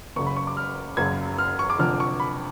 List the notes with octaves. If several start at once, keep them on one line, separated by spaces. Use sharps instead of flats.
F#1 F#2 C#3 C#6
B5
C#6
D6
F6
F#1 F#2 C#3 G#6
F6
C#6
D6
F1 F2 D3 F6
C#6
B5